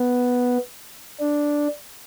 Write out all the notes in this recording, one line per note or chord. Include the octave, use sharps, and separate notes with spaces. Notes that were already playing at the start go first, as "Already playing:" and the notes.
Already playing: B3
D4